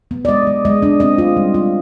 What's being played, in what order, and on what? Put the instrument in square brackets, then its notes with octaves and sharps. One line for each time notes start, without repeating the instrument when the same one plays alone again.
[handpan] B3
D5
G#3 D#5
G#3
G#3 D#5
D4
C4 D#5
F4
G3
F4